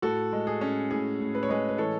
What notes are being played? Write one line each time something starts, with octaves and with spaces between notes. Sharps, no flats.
A2 F#4 A4
G#3
G#4
C#4
A2 G#4
A2
B4
C#5
G#3 G#4 B4
B4
E3 A4 C#5